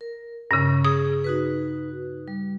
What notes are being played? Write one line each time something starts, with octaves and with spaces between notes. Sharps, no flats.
A#4
G2 C#3 C#4
G#4 D#6
D#4 F#4 B4
G3